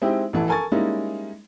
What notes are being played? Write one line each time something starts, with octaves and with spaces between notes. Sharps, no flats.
G#3 C4 D#4 E4 G4
A1 E3 A4
A4 A#4 G#5 C#6 A6
G3 G#3 A#3 C#4 D#4 E4